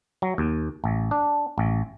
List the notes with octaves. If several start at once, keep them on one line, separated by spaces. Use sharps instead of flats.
F#3
D#2
A1
D4
A1